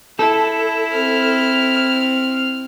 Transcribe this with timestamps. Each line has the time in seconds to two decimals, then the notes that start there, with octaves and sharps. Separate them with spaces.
0.19 E4 A4
0.93 C4 F6